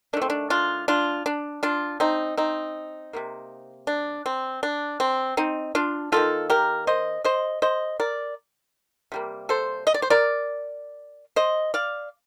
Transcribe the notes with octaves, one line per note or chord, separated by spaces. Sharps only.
D#3 A3 C4 D4
D4
D4 F4
D4 F4
D4
D4 F4
C4 D#4
C4 D#4
C3 D#3 A#3
D4
C4
D4
C4
C4 D#4
D4 F4
D#3 G3 A#3 F4 A4
G4 A#4
C5 D#5
C5 D#5
C5 D#5
A#4 D5
C3 G3 A#3
A4 C5
D#5
D5
C5
A#4 D5
C5 D#5
D5 F5